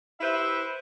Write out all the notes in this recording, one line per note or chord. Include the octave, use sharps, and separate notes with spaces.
E4 G4 B4 C5 E5